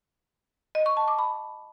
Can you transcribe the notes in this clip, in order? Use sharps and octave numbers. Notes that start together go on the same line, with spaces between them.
D#5
C#6
A5
D6
B5